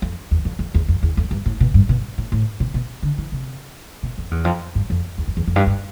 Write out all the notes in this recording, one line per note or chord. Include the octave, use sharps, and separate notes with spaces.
F2
E2
F2
F2
E2
F2
E2
F2
G2
A2
B2
G2
B2
A2
A2
B2
B2
D3
E3
C3
B2
F2
E2
F2
G2
F2
E2
F2
E2
F2
G2
G2